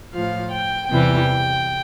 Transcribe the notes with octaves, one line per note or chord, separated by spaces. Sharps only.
A2 F3 F5
G5
E2 C3 E3 G3 G5